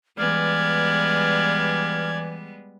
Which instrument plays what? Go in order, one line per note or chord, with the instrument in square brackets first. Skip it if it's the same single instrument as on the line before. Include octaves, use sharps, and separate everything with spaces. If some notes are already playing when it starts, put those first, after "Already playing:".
[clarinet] E3 [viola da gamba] G3 G#3 B3 [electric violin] D5 G#6 [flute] F6